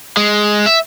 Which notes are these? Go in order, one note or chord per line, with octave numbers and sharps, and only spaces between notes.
G#3
E5